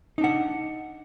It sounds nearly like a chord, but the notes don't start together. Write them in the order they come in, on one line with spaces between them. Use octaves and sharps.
D#4 D4 F#5